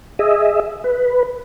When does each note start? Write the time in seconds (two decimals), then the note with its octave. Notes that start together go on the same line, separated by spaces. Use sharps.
0.19 G#4 D#5 E5
0.84 B4